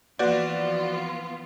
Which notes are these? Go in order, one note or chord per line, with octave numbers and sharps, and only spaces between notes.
E3 F3 A#3 B3 F4 F#4 B4 D5